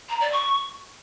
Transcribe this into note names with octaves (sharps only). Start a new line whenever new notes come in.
A#5
D5
C#6